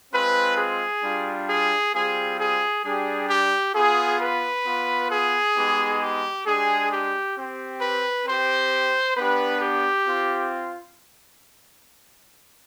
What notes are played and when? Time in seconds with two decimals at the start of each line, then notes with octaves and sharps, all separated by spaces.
0.13 G#3 C4 F4 B4
0.58 G#4
1.03 G3 D4 F4
1.48 G#4
1.94 G3 C4 F4 G#4
2.39 G#4
2.85 G3 D4 G4 G#4
3.29 G4
3.74 B3 F4 G#4
4.20 B4
4.64 B3 F4
5.11 G#4
5.56 G#3 B3 D#4 G4
6.00 G4
6.45 G#3 D4 G4 G#4
6.90 G4
7.36 C4 G4
7.81 B4
8.26 C4 G4 C5
9.17 B3 D4 G4 B4
9.61 G4
10.06 C4 F4